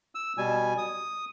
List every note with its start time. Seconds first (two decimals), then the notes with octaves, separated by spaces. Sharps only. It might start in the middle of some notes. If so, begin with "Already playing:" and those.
0.15 E6
0.37 B2 G3 G#5
0.78 D#6